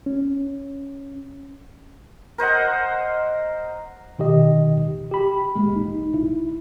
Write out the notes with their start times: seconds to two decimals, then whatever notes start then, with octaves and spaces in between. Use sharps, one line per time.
0.06 C#4
2.38 A#4 C5 D#5 F#5
4.19 B2 D#3 G4 D#5
5.11 G4 B5
5.56 G#3 A#3
5.73 A1 D#4
6.14 E4